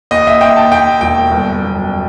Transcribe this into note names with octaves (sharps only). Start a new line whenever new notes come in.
D#2 D#5
E5
D#2 G5
A5
D#2 G5
E1 G5
G1
F#2